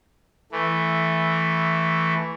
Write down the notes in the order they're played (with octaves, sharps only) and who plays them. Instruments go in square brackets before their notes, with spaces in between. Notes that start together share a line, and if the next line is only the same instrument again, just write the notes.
[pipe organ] E3 A3